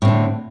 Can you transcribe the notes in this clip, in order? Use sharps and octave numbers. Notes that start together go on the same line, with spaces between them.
A2 D3 C4